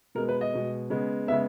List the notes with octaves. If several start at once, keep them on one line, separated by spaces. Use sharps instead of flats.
B2 G#3 B3 A#4
B4
D#5
B2 G#3 B3
C#3 G#3 B3
C#3 G#3 B3 E5